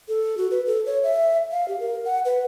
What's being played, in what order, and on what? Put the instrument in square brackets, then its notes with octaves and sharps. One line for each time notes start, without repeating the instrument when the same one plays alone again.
[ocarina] A4
F#4
B4
A4
C#5
E5
F5
G4
A#4
F#5
B4